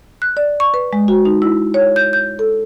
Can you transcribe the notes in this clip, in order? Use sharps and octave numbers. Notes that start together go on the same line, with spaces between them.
F#6
D5
C#6
B4
G#3
F#4
D#4
E4
C#5
G6
G6
A4